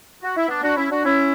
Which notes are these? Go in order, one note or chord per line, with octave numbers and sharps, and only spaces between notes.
F#4
E4
B3 D4
D4 F#4
C#4 E4
D4 F#4
C#4 E4